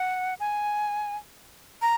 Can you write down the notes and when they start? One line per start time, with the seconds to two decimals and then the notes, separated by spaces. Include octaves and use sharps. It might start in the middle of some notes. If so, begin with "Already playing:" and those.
Already playing: F#5
0.40 G#5
1.82 A#5